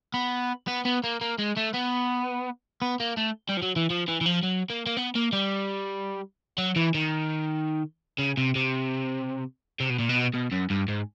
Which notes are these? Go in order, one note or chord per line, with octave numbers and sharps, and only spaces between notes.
B3
B3
B3
A#3
A#3
G#3
A3
B3
B3
A#3
A3
G3
F3
F#3
E3
F3
E3
E3
F3
F#3
A#3
A#3
B3
A#3
G3
F#3
E3
D#3
C#3
C3
C3
C3
B2
A#2
B2
B2
F#2
G2
G#2